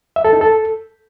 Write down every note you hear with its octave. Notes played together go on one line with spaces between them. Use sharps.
E5
A4
D#4
A4